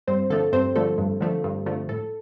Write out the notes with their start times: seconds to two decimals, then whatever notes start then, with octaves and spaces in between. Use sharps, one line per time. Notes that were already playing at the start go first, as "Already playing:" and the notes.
0.07 G2 C4 C5
0.30 D3 F3 A3 A4
0.53 G2 C4 C5
0.76 D3 F3 A3 A4
0.98 G2
1.20 D3 F3 A3
1.44 G2
1.66 D3 F3 A3
1.89 A2 A4